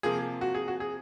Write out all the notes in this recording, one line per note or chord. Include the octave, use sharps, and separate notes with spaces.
C3 F3 A#3 G#4
F#4
G#4
F#4
G#4